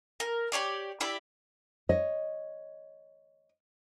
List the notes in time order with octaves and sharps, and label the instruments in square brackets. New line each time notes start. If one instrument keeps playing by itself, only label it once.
[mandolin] A#4
G4 G#4 C#5 D5
E4 G4 D5 E5
[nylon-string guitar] C#5 D#5